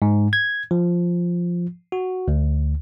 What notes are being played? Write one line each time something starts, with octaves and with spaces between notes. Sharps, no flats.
G#2
G#6
F3
F#4
D2